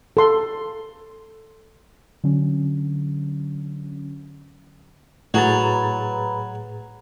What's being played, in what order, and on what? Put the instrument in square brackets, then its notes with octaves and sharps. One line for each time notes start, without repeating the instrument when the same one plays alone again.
[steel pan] A4 C6
[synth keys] D3 F#3 C#4
[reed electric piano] A2 G#4 A6 [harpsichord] F#3 [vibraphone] B4 A#5 B5